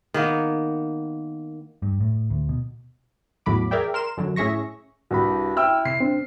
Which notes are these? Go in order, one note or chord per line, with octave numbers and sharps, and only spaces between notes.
D#3 A#3 B3
G2
A2
D2
B2
E2 A2 F#3 B5 D6
G#4 A#4 D5 E5 G5
A#4 C6 E7
F#2 D3 F#3
A2 C#4 G#4 E5 C#6 A#6
C2 G2 F#4 B5
E4 G5 E6 F6
C3 C7
C4 D4